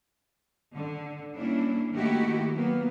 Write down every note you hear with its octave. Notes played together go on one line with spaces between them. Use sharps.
D3
G3 A#3 C#4 D4 E4
D#3 A3 A#3 E4 F#4 G4
F#3 A#3 B3